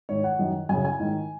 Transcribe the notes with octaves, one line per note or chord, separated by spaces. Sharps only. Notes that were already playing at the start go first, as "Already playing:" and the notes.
G#2 D#3 C#5
F#5
F#2 D#3
F#2 C#3 G#5
G#5
G#2 D#3